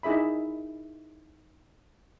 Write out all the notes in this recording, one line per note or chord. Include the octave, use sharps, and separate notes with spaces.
D#4 E4 G#4 E5 B5